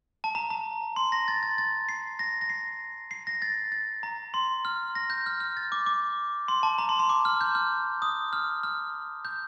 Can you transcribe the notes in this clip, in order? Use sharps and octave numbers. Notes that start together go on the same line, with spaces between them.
A5
A#5
A#5
C6
A#6
A6
A6
A6
C7
A#6
A#6
C7
C7
A#6
A6
A6
A#5
C6
F6
A#6
G6
F6
F6
A6
D6
D6
C6
A5
A#5
C6
C6
D6
F6
G6
F6
D#6
F6
F6
G6